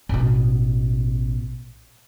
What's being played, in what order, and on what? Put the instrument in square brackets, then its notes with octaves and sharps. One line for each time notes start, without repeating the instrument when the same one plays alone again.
[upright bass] A1 B2